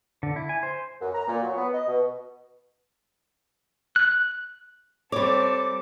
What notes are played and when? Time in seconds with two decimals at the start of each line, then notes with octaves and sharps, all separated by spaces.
0.23 D3
0.36 E4
0.49 G#5
0.63 C5
1.01 F#2
1.14 A#5
1.27 A#2
1.42 F#3
1.56 B3
1.74 D#5
1.87 B2
3.96 F#6
5.12 G3 C4 A4 C#5 D6